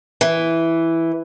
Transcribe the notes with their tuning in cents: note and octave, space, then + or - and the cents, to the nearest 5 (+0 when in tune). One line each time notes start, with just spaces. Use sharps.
E3 +0